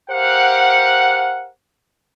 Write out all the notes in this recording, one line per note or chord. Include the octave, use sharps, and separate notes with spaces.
G4 A#4 C5 F5 F#5